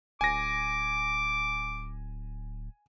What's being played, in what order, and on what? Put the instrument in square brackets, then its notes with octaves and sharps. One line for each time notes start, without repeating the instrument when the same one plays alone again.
[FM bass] D1 [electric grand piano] G#5 A#6 [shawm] D6